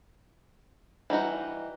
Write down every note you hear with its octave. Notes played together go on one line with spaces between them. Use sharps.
E3 G3 D#4 F#4